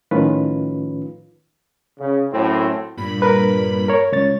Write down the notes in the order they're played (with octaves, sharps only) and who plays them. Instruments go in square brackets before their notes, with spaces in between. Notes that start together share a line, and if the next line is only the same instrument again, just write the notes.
[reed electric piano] A2 D#3 F3 C#4 F4 B4
[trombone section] C#3
F#2 A2 C4 E4
[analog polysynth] G2 A#2 B5
[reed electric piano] A#4 B4
A#4 C#5
C#2 C#5 A6